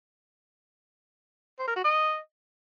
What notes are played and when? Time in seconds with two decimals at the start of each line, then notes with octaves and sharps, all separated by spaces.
1.59 C5
1.68 A#4
1.76 F#4
1.84 D#5